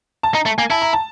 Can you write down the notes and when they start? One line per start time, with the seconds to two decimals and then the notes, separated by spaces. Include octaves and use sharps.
0.23 A5
0.34 D#4 A#5
0.45 A3 A5
0.58 A#3 G#5
0.70 E4 A5
0.82 A#5
0.93 A5